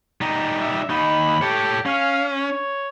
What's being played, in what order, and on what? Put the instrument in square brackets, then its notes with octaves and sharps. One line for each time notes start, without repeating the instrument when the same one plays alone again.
[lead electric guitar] G3 D#4
[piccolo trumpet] E5
[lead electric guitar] D#2 D#4 [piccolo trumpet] B5
[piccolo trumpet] G4 [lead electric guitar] A4 C#5
[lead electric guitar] C#4 [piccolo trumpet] F5
[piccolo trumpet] C#5